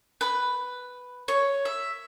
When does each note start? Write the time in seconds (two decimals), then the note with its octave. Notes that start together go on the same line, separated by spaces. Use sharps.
0.21 B4
1.28 C#5
1.65 E5